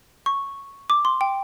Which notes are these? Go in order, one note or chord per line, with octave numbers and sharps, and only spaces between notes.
C#6
D6
C6
G5